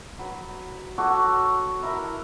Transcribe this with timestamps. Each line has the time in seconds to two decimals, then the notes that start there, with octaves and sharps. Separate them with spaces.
0.19 F#3 B4
0.98 F#4 A4 C#5 D6
1.83 E4 A#4 E5 A#5